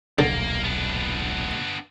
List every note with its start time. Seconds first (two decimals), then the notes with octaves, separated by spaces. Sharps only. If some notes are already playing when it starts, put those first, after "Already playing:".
0.19 D#1 B1 D3 A#3
0.64 B3 D4